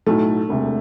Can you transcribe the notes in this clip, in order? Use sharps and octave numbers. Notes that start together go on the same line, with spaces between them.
B1 A2 F#3 A3
E1 D2 C3